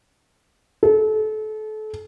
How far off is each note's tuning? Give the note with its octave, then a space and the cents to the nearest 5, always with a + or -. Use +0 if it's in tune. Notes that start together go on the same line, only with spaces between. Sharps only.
A4 -30